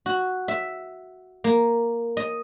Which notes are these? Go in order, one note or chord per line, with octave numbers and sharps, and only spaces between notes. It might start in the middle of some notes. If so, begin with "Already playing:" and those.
F#4
E5
A#3
D#5